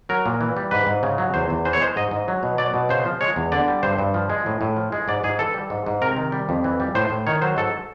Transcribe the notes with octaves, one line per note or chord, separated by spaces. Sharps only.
F#3 A#4
A#2
E3
G3
G#2 B4
G#2
C#3
F#3
E2 C5
E2
E3 C5
C#5
G#3 C5
G#2 D#5
G#2
F#3
B2
F#3 D5
B2
C#3 C5
F3
G#3 C#5
E2
D3 D5
G3
G2 C5
G2
F3
G#3
A2
A2
F3
G#3
G#2 D5
G#2 G#4
E3 A4
G3
G#2
G#2
C3 A#4
D#3
G3
F2
E3
G3
A2 C5
A2
D#3 C#5
F#3 C5
G#2 A4